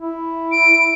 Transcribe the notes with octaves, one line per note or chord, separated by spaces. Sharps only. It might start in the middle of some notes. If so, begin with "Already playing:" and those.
E4
D7